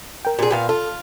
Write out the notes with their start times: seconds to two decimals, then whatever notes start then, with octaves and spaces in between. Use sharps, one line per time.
0.25 A#4 G5
0.39 A#2 G#4
0.51 A#2 B3 F5 G5
0.69 F4 A4